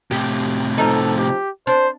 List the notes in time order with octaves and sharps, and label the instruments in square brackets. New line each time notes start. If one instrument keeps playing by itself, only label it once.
[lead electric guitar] A2 C3 [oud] G4
[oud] F3 D#4 [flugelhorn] A4
[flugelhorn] G4
[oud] D4 [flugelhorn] C5